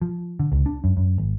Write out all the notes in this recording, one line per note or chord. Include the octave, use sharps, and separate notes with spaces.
F3
D3
C#2
D4
F#2
F#2
G#1